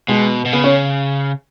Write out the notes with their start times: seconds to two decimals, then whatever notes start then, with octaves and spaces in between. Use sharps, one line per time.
0.08 B2 G#3
0.45 B2
0.52 C#3 B3
0.64 C#4